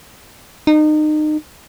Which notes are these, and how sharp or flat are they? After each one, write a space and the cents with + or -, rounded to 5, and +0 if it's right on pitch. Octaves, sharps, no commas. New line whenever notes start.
D#4 -30